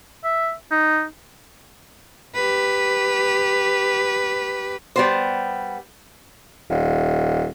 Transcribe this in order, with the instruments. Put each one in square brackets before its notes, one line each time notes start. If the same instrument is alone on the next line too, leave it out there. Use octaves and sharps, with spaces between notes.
[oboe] E5
D#4
[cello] G4 B4
[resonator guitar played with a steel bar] G3 B3 C5
[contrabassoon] D#1